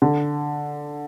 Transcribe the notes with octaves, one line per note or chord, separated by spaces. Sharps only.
D3